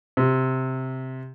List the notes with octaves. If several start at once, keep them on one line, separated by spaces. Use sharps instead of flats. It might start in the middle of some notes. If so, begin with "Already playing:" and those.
C3